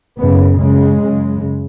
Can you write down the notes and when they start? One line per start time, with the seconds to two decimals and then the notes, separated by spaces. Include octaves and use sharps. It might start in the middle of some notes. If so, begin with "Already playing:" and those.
0.19 F#2 C#3 B3
0.59 F#2 C#3 G#3
1.00 F#2 C#3